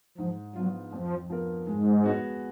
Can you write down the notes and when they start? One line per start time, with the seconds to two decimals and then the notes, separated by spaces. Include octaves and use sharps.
0.18 G#2 F3
0.55 F3 F#3 B3 F4
0.92 F2 F3
1.30 F3 B3 F4 A#4
1.67 G#2 G#3
2.04 B3 F#4 C#5